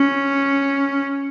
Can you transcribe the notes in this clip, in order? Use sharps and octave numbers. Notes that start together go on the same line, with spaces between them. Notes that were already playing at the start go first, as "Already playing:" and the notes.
Already playing: C#4